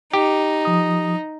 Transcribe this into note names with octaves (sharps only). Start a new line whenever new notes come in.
D#4 G4
F3 D#6